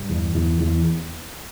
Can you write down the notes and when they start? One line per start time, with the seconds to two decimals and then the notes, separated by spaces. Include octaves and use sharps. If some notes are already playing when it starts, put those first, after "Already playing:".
Already playing: G2
0.10 E2
0.35 E2
0.60 E2